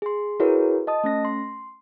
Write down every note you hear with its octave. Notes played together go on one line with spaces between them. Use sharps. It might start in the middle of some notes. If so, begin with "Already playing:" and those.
G#4 C6
E4 F#4 G#4 A#4 B4 C#5
D#5 A5 D#6
A3 C#4 A#6
C6